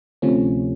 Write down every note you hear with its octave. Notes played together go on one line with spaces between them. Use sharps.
D2 C3 F3 A3 C#4